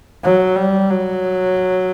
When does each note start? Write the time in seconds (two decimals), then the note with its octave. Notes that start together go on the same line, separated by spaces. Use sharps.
0.24 F#3
0.56 G3
0.90 F#3